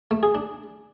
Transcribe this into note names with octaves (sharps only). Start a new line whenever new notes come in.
A3
G#4
D4